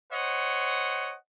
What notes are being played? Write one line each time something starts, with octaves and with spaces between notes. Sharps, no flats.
C5 C#5 D#5 F#5